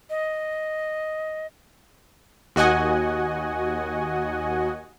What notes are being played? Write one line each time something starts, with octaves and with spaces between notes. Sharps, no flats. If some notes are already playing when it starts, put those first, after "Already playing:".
D#5
D#2 F#4 D#5 F#5 G#5